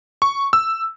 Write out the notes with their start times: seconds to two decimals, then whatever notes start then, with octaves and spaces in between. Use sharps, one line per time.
0.22 C#6
0.53 E6